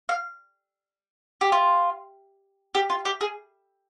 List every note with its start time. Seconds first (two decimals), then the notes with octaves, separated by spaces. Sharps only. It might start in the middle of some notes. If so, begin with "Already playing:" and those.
0.09 F5
1.41 G4
1.52 F4
2.75 G4
2.90 F4
3.05 G4
3.21 G#4